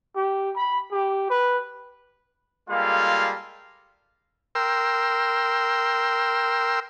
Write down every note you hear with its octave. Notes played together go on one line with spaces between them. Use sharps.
G4
B5
G4
B4
G3 G#3 A#3 F4 A4 F5
A#4 G5 C6 E6